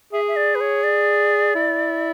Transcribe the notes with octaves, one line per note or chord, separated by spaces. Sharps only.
G#4 E5
E5
D5
B4
C#5
D5
E4